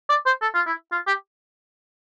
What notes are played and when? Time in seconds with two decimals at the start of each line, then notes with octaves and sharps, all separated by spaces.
0.10 D5
0.26 C5
0.42 A4
0.55 F4
0.67 E4
0.92 F4
1.07 G4